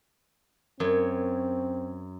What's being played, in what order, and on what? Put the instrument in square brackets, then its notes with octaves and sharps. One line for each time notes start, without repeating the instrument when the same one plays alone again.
[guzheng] F#2 C#5 [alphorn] C4